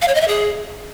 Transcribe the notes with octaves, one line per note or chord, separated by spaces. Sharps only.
F5
C#5
D#5
E5
G#4